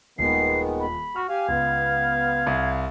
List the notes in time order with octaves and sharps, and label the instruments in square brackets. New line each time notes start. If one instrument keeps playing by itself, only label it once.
[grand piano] D#1 [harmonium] D#3 G#3 B3 [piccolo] C7
[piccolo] B5
[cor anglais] F#4 [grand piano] F6
[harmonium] G4 G#5 [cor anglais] F5
[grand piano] C#2 [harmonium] B3 [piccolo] G#6
[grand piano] C2